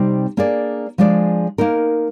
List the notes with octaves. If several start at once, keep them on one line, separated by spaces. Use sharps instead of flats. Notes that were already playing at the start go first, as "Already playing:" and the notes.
Already playing: C3 G3 C4 D#4
A#3 D4 G#4 D5
F3 G#3 D4 G#4 D5
A#3 D#4 A#4